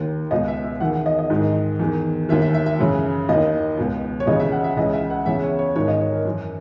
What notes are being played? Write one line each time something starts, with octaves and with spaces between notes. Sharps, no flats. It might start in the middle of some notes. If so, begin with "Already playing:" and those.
Already playing: D#2 D#3
C#2 B2 D#5
E5
E5
E2 D#3 F#5
D#5
D#5
G#2 D#3
E2 D#3
D#2 D#3 E5
E5
E5
E5
F#2 C#3 E3
D#2 D#3 D#5
C#2 B2
C#5
D#2 C#3 E3 D#5
E5
F#5
E5
C#2 C#3 E3 D#5
E5
F#5
E2 C#3 E3 E5
C#5
C#5
G#2 D#3 C#5
D#5
C#5
A#4
F#2 E3